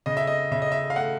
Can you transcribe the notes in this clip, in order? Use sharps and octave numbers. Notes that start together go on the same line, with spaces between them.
C#3 D#5
E5
D#5
C#3 E5
D#5
E5
F5
A3 F#5